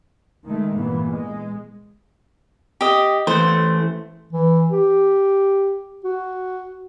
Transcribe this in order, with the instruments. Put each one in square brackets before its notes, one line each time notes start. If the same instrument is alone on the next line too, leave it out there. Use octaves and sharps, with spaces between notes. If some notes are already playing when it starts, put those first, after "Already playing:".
[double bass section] D#3 G#3 A3
G2 A#2 E3 B3
G#3
[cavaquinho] G4 D#5
[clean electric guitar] E3 A3 [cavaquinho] C5
[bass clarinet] E3
G4
F#4